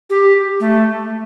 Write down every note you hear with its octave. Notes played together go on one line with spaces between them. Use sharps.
G4
A3